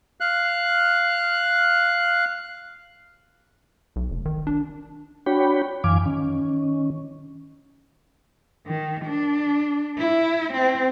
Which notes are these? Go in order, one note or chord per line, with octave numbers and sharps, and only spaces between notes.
F5 F#6
B1
F1
D#3
D4
D4 F#4 C#5 G5 B5
F#2 E3 F5 G#5 D6
D#3 C#4
D#3
D4
E4
C4